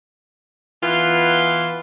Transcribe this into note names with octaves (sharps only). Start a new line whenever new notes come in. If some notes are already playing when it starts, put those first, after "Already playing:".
E3 B3 F4